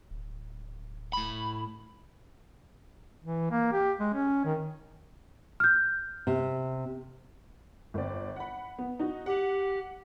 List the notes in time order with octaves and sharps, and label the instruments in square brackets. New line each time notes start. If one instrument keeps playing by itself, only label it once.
[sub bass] D1
[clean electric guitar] A2 B5
[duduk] E3
A#3
G4
G#3
C#4
D#3
[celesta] F6 G6
[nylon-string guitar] C3
[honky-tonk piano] G1 C4 D5
F#5 B5
B3
D#4 F#4
[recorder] G4 [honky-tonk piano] F#5